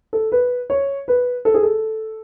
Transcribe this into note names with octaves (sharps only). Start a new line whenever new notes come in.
A4
B4
C#5
B4
A4
G#4
A4